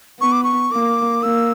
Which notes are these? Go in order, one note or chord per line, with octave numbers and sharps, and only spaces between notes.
B3 C#6
D6
C#6
A#3 D6
A#3 E6